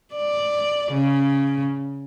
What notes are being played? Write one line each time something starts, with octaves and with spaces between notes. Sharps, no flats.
D5
C#3